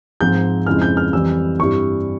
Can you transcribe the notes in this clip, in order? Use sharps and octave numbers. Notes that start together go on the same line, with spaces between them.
G#2 F3 G#3 C4 G6
F2 C#3 F3 G#3 E4 F6
G6
F6
F2 E3 G3 E6
G2 G3 C4 E4 C#6